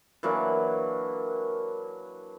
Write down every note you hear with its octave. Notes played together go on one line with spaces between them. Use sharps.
E3 F#3 A#3 D4